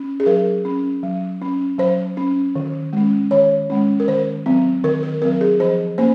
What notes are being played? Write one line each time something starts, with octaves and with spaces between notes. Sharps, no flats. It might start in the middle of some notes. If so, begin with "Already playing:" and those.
Already playing: C#4
G#4
F#3 A#4
C#4
F#3
C#4
F#3 C5
C#4
D#3
G#3 C#4
D#3 C#5
G#3 C#4
A#4
D#3 C5
F#3 C4
D#3 A#4
A#4
F#3 C4 A#4
G#4
F3 C5
A#3 C#4 C5